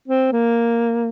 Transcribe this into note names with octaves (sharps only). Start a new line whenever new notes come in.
C4
A#3